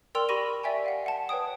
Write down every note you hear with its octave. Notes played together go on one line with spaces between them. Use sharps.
A#4 D5 G5 C6 E6 F7
G4 B5 C#6 A#6 D#7
D5 E5 G5 G#5
F5 F#5
F#5 A5
B4 C#5 G5 D#6